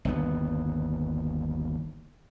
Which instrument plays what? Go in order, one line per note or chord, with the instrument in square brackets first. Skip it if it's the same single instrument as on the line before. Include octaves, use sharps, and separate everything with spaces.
[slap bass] G1 D#2 B3